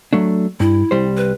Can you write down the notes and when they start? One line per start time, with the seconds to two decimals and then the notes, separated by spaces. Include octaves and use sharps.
0.13 F#3 A3 D4
0.60 G2 E4
0.91 C2 G3 C5
1.17 B4